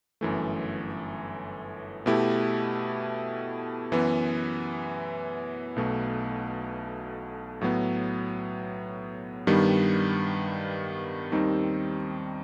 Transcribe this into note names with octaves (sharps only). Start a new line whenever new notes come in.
G1 F#2 E3 A3
B2 A3 E4 G4
F#2 E3 B3
B1 B2 A3
A2 F#3 B3
G2 D#3 G3 B3
D#2 D#3 G3 C4 D#4